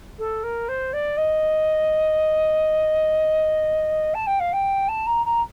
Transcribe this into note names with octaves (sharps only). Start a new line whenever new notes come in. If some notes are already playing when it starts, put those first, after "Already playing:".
A4
A#4
C5
D5
D#5
A5
G5
F5
G5
A5
A#5
A#5